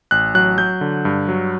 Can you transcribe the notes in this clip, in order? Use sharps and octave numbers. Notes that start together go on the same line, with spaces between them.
A1 F#6
F#3 F#6
F#3 G6
D3
G2
F#3